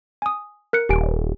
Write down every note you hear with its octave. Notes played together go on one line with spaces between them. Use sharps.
G#5 D#6
A#4 F#6 C#7
D#1 G4 G#5 D7